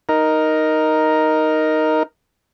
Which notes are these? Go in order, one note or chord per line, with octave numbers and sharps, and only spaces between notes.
D#4 A#4